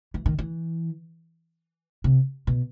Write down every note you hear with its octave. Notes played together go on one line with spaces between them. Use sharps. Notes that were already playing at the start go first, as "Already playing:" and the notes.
E3
D#3
E3
C3
B2